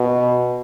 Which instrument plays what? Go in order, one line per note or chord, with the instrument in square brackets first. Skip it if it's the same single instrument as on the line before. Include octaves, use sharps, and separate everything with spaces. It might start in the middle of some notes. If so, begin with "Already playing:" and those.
Already playing: [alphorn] B2